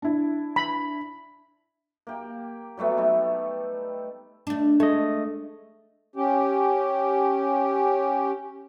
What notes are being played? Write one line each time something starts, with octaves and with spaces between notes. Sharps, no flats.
D4 E4
B5
A#3 G4
F#3 G3 A3 B3
G3 A3 D#4 E5
A3 D4
G#3 A3 D#5
C#4 G4